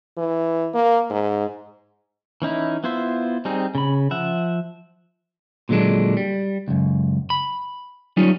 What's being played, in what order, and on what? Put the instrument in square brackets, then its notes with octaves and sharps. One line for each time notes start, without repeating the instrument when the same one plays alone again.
[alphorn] E3
A#3
G#2
[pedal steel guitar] E3 C#4 D#4 E4
B3 E4 F4 C5 E5
G3 C4 D#4 G#4
C#3 B5
F3 E5 F#5
[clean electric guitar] A#2 D3 F#3 G#3 D4
G3
C#2 F#2
B5
F#3 G3 C#4 D#4 F4